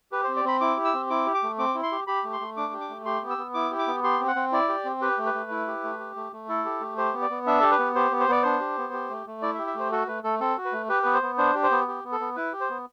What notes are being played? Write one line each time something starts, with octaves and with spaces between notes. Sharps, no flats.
G4 B4
C5
C4
D5
C4 B5
E4 D6
G4
E6
C4
E4 D6
G4
D6
A3
C4 D6
E4
C6
G4
G4 B5
A3
C6
A3
D4 D6
G4
D6
A3
G4 C6
B3
E6
B3
E4 D6
G4
D6
B3
G4 C6
C4
F#5
C4
E4 D5
G4
C4
G4 B4
A3
B4
A3
E4
G4
A3
G4
A3
A3
E4 A4
G4
A3
G4 C5
B3
D5
B3
D4 E5
G4 A4
B4
B3
G4 C5
B3
C5
B3 D5
D4 C5
G4
B3
G4
A3
A3
E4 D5
E5
G4
E5
A3 C5
F#4 A4
A3 B4
A3 A4
C4 A4
F#4
B4
A3
G4 B4
B3 B4
C5
B3
D4 C5
G4
C5
B3
G4
B3
A4
B3
E4 B4
G4
C5
B3